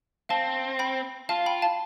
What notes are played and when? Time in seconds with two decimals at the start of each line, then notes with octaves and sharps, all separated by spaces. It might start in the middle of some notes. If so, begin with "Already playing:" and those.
0.29 C4 F5 A5
0.79 G5 B5
1.29 F4 F5 A5
1.46 G5 B5
1.62 F5 A5